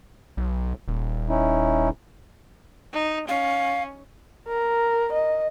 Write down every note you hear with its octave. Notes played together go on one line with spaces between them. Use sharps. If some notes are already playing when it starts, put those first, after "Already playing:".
B1
D#1
C#4 D#4 E4
D#4
C#4 F5
A#4
D#5